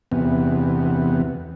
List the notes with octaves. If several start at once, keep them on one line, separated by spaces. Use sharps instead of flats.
E2 C3 B3